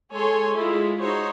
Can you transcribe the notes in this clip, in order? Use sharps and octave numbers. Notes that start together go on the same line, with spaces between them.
G#3 A4 C#5 G#5 C6
G#3 E4 F4
D#4 F#4 C5 C#5